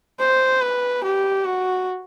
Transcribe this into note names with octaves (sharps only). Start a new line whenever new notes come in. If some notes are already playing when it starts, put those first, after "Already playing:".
C5
B4
G4
F#4